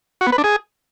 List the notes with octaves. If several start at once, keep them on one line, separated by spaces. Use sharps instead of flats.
F#4
B3
B4
D4
G#4